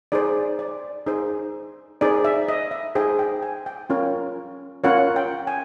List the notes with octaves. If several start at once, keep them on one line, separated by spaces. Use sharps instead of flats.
D#4 G#4 C5 D5
D5
D#4 G#4 C5
D#4 G#4 C5 D5
E5
D#5
E5
D#4 G#4 C5 G5
G5
G#5
G5
C#4 F4 A#4 C#5
C#4 F4 A#4 C#5 F#5
G5
G#5